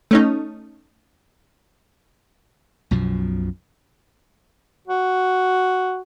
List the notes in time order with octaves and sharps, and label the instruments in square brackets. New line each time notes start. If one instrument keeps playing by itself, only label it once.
[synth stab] A3 C#4 D#4
[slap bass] B1 F#2 B2 F3
[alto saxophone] F#4